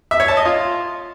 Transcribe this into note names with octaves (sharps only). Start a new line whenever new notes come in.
E5
C#5
A5
D#5
F4